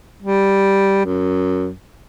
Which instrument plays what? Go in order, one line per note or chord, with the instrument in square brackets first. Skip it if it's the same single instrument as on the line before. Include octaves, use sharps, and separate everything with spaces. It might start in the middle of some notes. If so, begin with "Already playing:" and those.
[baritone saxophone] G3
F#2